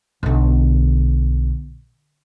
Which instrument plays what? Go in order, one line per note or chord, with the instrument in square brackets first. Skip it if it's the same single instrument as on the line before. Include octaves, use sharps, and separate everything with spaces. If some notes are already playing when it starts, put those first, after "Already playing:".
[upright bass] B1 D3